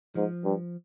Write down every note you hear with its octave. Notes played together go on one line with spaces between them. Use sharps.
G#2 F3
G2